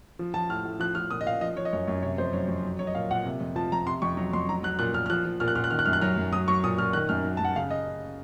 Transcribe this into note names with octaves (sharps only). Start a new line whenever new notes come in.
F3
F3 A5
A2 F6
A2
F3 F#6
F3 F6
A#2 D#6
D#5
A#2 F5
F3 D#5
F3 C#5
D#5
F#2 C#5
F#2 C#5
C3 C#5
F2 C5
F#3 C#5
F2
F#3
F#3 C#5
D#5
A#2 F5
A#2 F#5
C3
F2
F3 A5
F2 A#5
C3 C6
F2 C#6
F#3
F2 C6
F#3 A#5
F#3 F#6
A#2 F#6
A#2 F6
F6
F3 F#6
F3
A#2 F6
F#6
A#2 F6
F#6
D#3 F6
F#6
F#2 F6
F#6
F#3 F6
F#2
F#3 D#6
F#3 C#6
A#2 D#6
A#2 F6
D#3 F#6
F#2 F6
F#3
A5
F#2 F#5
C#3 F5
D#5